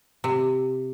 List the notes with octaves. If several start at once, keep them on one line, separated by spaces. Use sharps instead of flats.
C3